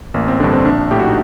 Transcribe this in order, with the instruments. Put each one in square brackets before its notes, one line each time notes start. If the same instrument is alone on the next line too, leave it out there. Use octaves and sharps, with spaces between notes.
[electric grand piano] A1 A#3
C4
G2 D3 D4
C4
A#1 D4
A2 G4
F#4
D#4